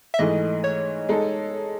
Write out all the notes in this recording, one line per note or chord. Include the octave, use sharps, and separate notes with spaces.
E5
G#2 E3 A3 D#5
C#5
G#3 D#4 A4